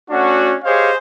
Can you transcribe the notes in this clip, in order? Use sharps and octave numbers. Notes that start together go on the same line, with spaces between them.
A3 C#4 D4 F#4
G4 G#4 C5 C#5 D#5 F5